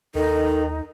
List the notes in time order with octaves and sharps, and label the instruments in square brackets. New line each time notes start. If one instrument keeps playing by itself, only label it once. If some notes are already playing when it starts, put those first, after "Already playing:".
[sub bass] D#2 [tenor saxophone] D#3 [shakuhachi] D#4 [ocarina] A4